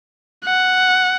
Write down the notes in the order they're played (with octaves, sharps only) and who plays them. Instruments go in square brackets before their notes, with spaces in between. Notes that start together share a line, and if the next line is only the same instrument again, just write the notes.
[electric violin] F#5